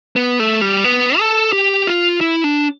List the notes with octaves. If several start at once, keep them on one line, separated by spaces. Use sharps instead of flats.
B3
A3
G3
B3
A4
G4
F4
E4
D4